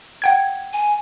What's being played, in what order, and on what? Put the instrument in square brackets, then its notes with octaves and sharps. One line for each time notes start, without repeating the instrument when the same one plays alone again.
[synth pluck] F#5 G5 G#6
[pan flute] G#5